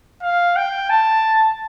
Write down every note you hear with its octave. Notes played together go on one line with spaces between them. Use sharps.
F5
G5
A5